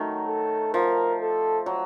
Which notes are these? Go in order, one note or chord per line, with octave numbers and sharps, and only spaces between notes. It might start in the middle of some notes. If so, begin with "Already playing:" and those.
Already playing: D#3 F#3 A3
A4
F3 A#4
A4
F#3